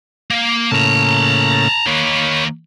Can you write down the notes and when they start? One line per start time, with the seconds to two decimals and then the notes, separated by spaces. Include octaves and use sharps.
0.31 A#3
0.72 A2 C#3 A#3 A5 A#5
1.86 D#3 A#3 C#5 B5